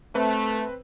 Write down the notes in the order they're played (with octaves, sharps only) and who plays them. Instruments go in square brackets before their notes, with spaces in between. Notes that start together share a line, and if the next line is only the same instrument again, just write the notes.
[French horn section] A3 [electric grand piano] C4 B4